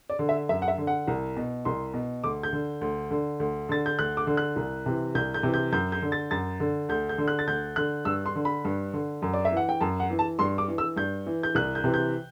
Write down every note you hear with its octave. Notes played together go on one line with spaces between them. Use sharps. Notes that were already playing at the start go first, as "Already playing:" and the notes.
D5
D3
E5
F#2 E5
F#5
E5
D3
F#5
C2
B2
C2 C6
B2
D2 D6
G6
D3
D2
D3
D2
D3 A6
G6
D2 F#6
D6
D3
F#6
C2
C3 E3
C2 G6
G6
C3 E3
G6
F#2 G6
G6
D3
A6
F#2 A6
D3
D2 G6
G6
D3
F#6
A6
D2 G6
D3 F#6
G2 E6
C6
D3
B5
G2
D3
F#2
D5
E5
E3 F#5
G5
F#2 A5
F#5
E3
A5
G2 C6
D6
E3
E6
G2 G6
E3
G6
C2 F#6
G6
C3 E3
G6